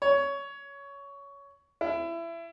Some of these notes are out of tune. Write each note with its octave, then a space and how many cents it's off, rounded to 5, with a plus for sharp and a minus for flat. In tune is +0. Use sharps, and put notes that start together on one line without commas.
C#5 +15
E4 +25